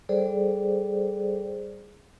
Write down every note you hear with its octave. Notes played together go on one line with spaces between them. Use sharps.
G3 G#4 A4 C5 D5